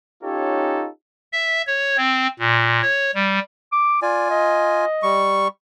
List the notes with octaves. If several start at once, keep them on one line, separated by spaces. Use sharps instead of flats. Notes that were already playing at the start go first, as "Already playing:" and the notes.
C#4 D#4 F4 G4 A4 C#5
E5
C#5
C4
A#2
C#5
G3
D6
F4 D5 G#5
D#5
G3 C#6